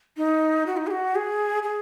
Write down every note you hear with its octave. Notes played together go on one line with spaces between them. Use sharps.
D#4
F#4
D#4
G#4
F#4
G#4
G#4